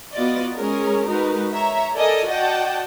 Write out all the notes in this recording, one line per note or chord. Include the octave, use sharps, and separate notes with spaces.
B3 F4 F#4 D5 D#5
G#3 C#4 G#4 A#4
G#3 D#4 F#4 A#4 B4
C#5 E5 A#5
A4 A#4 D5 D#5 G#5
F#4 D5 D#5 F#5 G5 A5